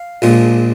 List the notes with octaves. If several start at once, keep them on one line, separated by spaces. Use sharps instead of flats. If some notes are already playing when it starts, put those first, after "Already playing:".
Already playing: F5
A#1 A#2 F3 G#3